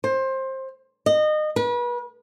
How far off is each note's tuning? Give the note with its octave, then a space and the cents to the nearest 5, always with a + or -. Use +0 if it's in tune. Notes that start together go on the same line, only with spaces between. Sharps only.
C5 +20
D#5 -25
B4 -35